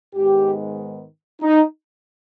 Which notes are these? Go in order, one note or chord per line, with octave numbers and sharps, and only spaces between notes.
G#2 D#3 G#3 B3 G4
D#4